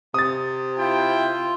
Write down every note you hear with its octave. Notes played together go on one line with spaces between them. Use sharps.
C3 D#6 A6
E4 F4 G5